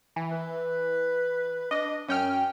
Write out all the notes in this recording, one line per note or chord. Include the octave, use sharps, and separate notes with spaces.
E3
B4
D4 D#5
F#2 C#4 G5 F6